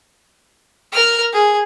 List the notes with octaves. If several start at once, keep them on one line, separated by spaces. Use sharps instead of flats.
A#4 F6
G#4